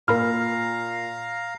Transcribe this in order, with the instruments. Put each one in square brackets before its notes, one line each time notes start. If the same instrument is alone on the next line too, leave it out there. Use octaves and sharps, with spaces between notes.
[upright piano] A#2 [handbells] A#4 B5 F6 [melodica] F5 A#5